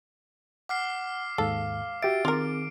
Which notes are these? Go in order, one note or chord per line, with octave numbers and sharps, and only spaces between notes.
F#5 D6 F6 C7
D#2 G#2 A4 F5
F#4 G4 E5 A6 D7
D#3 C4 F4 G#4 A#4